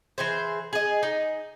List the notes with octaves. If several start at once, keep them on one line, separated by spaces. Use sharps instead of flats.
E3 G#4 C5
G#4 D#5
D#4